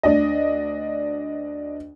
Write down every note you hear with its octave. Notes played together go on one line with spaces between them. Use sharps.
D2 D4 D#5